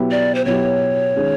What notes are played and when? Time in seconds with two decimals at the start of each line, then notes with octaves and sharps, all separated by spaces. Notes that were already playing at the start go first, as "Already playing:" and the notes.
Already playing: B2 F#3 B3 E4 G4
0.11 D5
0.35 C5
0.45 B2 F#3 B3 E4 G4 C#5
1.15 D#3 G#3 C#4